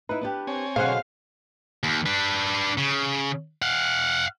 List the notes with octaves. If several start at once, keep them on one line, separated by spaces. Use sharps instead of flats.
D#4 E4 B4
B3 D4 G4
C4 C#5 G#5
B2 D3 F#3 G#4 C5 F5 F#5
D#2
D4 B4
C#3
F5 F#5